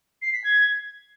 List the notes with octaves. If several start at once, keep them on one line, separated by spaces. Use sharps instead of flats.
C7
B6
G#6